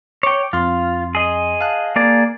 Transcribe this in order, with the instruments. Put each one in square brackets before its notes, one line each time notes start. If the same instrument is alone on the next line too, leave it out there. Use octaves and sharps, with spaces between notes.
[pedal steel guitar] C#5 G5 [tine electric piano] D6
[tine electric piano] F2 C6 [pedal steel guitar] F4
[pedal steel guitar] G#4 D#5
[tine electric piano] F5 A5 F#6
[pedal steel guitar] A#3 G#4 D5